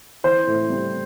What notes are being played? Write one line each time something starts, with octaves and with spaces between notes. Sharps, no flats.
E3 C5
A2
G3